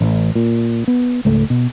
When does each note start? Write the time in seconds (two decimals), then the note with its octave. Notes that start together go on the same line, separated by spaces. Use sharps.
0.01 A1
0.35 A#2
0.88 B3
1.25 C#2 G#2 A3
1.50 B2